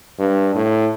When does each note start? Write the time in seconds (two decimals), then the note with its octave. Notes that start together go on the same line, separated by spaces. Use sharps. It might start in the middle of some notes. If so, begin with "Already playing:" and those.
0.19 G2
0.55 A2